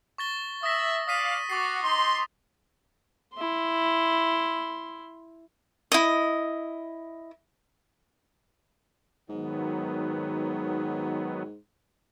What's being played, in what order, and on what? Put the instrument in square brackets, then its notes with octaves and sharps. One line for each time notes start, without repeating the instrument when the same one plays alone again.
[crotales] C#6 A6 G7
[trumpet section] E5 [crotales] D#6 A#6
[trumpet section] D5 F5 [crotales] D#6 B6 D#7
[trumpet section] F#4 [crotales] D6 A6 C7
[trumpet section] D#4 C6
[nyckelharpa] E4 C6
[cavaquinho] E4 D#5
[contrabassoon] G#2 [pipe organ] D#3 F#3 B3